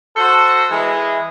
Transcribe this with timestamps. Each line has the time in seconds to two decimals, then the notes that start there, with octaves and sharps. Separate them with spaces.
0.17 F#4 A4 C5
0.71 E3 G#3